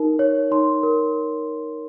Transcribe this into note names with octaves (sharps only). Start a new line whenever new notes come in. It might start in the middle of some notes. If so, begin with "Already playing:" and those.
Already playing: D#4 A#4
C#5
D#4 C6
A#4